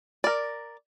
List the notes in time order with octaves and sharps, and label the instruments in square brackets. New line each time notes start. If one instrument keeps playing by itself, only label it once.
[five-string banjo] A#4 D5